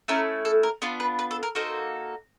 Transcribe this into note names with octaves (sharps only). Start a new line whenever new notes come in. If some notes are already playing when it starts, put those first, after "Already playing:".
A3 C#4 E4 A#4
A4
A#4
B3 D4 F4 B4
B4
B4
A4
A#4
A#3 D#4 F#4 A4 C5